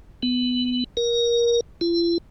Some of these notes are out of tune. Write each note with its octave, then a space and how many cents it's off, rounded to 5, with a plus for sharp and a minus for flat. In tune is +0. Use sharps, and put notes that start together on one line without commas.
B3 +15
A#4 +15
F4 -45